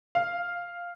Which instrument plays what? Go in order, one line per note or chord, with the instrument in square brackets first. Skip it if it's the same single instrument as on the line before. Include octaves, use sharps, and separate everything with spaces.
[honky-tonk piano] F5